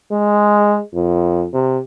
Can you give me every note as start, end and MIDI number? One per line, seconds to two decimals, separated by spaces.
0.12 0.79 56
0.94 1.46 41
1.54 1.80 48